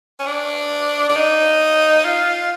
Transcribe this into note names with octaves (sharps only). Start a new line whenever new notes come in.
C#4
D4
D4
D#4
F4